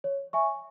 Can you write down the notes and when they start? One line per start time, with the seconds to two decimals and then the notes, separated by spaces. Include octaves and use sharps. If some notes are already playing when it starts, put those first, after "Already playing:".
0.04 C#5
0.33 E5 G#5 C#6